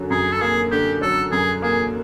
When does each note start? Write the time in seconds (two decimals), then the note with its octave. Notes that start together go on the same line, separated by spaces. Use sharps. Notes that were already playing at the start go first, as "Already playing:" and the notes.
Already playing: F#2 D3 F#3
0.10 F#2 G#4
0.32 A4
0.41 A#3 G#4
0.72 D3 G4
1.01 F#3 A4
1.32 F#2 G#4
1.62 A#3 G#4